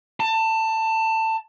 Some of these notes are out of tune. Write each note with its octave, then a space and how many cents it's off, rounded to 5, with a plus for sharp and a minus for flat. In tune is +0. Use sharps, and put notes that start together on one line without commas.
A5 +20